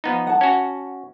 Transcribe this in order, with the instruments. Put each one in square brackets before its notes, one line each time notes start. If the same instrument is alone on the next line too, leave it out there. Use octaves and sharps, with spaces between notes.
[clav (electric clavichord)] F3 B3 D#4
[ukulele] F#5 A5
[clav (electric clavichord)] C#4 F#4